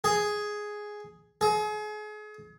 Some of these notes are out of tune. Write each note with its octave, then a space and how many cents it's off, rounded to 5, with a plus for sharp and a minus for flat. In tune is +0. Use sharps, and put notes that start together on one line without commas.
G#4 +5
G#4 +35